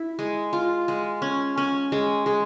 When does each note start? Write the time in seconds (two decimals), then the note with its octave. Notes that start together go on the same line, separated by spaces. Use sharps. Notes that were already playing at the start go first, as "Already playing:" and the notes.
Already playing: E4
0.19 G#3
0.53 F4
0.88 G#3
1.22 C#4
1.58 C#4
1.92 G#3
2.26 G#3